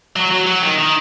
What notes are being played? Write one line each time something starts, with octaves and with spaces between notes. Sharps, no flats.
F#3
F#3
F#3
D#3
D#3